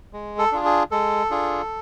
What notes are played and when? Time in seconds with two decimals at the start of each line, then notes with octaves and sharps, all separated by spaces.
0.13 G#3
0.38 A4
0.52 D4 F4 G#4
0.65 G#4
0.91 G#3 A4
1.30 D4 F4 G#4